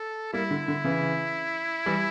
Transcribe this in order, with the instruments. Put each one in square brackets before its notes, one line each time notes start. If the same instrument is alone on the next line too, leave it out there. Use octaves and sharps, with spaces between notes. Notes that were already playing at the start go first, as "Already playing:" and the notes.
Already playing: [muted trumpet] A4
[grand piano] G3 A#3 [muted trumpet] E4
[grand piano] D3
D3
C#3 E3
E3 G3